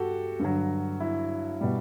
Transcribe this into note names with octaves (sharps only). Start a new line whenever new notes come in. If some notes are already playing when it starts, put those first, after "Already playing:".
Already playing: G2 F#4 G4 A4
G2 D3 F#3
E4
B2 G3